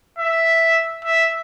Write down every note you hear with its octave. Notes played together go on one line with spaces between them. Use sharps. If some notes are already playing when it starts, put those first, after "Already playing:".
E5
E5